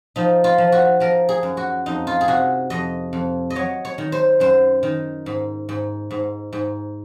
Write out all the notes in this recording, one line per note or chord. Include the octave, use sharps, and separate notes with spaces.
F3 D#4
F4
F3
F#4
F3 A#4
G#4
F#2
F#4
F2 D#4
F4
G#4
C3 F#4
F2 D#5
F2
D#5
F#3 C#5
C#5
D#3
C5
F#2 C5
D#3
G#2
G#2
G#2
G#2